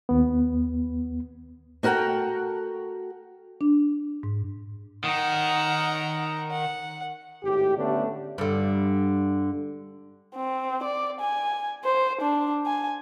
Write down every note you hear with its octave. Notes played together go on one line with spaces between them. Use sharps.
D#2 B3
A3 F#4 A#4 F#5 G5
D4
G#2
D#3 F#5 A#5
F#5
G#1 A2 G4
D3 A3 B3 C#4 D4
G2 D3
C4
D5
G#5
C5
D4
G#5